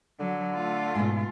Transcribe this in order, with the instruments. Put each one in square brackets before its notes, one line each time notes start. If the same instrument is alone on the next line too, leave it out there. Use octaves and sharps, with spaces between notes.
[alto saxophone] D3 [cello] F#3
[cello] A3 F4
[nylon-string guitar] G#2 B2